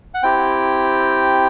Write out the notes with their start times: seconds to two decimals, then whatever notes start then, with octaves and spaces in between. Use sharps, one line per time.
0.14 F#5
0.23 C4 E4 G4 G5